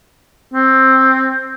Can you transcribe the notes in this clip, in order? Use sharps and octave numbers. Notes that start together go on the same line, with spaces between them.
C4